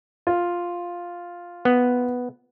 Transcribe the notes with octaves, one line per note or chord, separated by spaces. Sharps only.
F4
B3